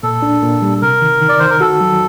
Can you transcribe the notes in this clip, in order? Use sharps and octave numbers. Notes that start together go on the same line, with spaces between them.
A#2 A4
D4
A#2
G3
C3 A#4
D#3
D#3
D5
D#3 C5
A#4
F#4 A4
F#3